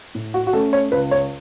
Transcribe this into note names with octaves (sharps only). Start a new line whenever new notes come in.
A2
F#4
F#4
A3 C#4 A4
C#5
C#2 B4
C#5